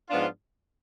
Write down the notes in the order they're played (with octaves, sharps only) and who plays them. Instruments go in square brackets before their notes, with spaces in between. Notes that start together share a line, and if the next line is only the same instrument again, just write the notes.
[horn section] G#2 F3 B3 D4 F4